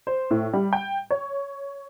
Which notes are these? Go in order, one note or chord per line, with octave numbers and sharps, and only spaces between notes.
C5
A2
G3
G5
C#5